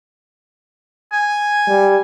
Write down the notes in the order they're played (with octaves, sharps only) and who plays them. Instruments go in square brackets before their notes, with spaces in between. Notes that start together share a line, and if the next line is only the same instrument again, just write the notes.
[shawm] G#5
[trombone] G3